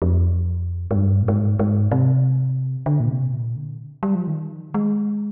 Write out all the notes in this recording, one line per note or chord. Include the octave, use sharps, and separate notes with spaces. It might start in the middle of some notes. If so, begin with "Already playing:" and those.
F2
G#2
G2
A#2
G#2
G#2
C3
D3
A#2
C3
A#2
D3
G3
F3
D#3
G#3